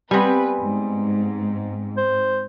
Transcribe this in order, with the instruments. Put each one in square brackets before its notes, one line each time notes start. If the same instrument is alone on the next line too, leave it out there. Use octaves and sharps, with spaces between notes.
[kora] G3 B3 [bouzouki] C4 G#5 [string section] B4
[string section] G#2
[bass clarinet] C5